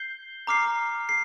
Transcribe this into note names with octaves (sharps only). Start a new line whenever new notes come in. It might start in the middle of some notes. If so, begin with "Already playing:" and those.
Already playing: G6 C7 G7
A#5 D6 F6 C7
C7